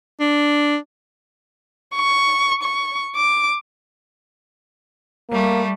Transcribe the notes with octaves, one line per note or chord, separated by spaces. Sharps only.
D4
C#6
C#6
D6
G3 A3 A#3